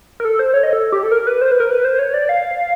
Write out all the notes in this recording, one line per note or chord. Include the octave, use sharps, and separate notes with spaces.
A#4
A4
C5
C#5
D#5
A4
G4
A4
A#4
B4
C5
B4
A#4
B4
C5
C#5
D5
F5